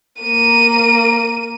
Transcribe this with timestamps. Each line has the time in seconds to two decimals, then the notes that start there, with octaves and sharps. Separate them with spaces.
0.21 A#3 D#7